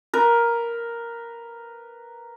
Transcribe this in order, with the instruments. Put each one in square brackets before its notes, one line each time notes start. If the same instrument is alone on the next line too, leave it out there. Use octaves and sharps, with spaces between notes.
[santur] A#4 B4